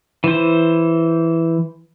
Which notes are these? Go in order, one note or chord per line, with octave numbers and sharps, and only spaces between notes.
E3 C5